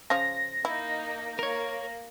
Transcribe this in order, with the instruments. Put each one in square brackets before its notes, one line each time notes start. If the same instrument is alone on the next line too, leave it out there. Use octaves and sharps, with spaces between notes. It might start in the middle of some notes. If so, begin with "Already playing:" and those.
[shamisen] C#3 F3 F4 [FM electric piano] A#6
[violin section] A#3 D#4 [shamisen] E4
[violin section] A#3 [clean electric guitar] A#4 C#5